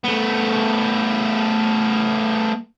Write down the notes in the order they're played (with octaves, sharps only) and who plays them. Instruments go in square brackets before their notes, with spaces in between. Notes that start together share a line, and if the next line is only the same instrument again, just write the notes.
[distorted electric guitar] A3 B3